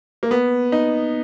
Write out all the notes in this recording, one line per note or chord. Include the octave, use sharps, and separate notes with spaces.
A#3
B3
D#4